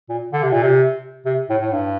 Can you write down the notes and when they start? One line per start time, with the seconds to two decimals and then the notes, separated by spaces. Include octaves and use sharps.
0.09 A#2
0.33 D3
0.43 C3
0.52 A#2
0.63 C3
1.26 C3
1.49 A2
1.61 A2
1.72 G2